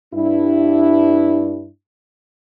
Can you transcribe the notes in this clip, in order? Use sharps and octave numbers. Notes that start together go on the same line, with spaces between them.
G2 D4 E4